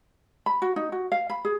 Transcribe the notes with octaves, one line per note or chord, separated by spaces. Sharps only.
B5
F#4
D#4
F#4
F5
B5
G#4